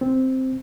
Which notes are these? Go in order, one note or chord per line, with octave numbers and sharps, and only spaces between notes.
C4